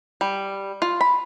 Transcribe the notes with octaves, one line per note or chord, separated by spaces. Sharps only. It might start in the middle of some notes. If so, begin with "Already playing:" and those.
G3
F4
B5